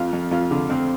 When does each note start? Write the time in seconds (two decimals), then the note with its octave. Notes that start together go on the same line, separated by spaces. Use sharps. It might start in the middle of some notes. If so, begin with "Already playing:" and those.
Already playing: F2 F4
0.13 F2
0.31 F2 F4
0.51 D3
0.69 F2 C4